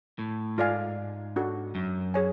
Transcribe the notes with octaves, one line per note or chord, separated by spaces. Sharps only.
A2
G#2 F4 A4 D5 F5 G#5
D4 F#4 A4
F#2
G#4 C#5 G#5